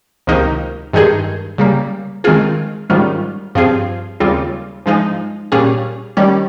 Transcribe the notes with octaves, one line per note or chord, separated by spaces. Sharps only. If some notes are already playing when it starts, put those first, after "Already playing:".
C#2 C3 D#3 A#3 D#4
G2 D#3 G#3 D#4 G#4
C#3 G3 A#3
D#3 G#3 C4 F4 G#4
G#2 D#3 G3 C#4 F4
G2 F3 C4 F4 G#4
D#2 C#3 G3 C4 F4
G#2 F3 G#3 D#4
A#2 G3 C#4 G#4
D#3 G3 C#4